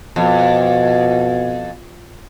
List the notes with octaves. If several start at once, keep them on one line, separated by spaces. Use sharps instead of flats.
F2 B2